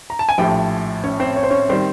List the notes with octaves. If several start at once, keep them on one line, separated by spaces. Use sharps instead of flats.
A#5
A5
G#5
A#1 A2 F3 G4 G5
C#4 C#5
C4 C5
C#5
C5
C#4 C#5
D#3 G3 C4 C5